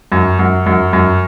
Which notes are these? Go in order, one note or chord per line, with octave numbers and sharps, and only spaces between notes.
F#2
F#2
F#2
F#2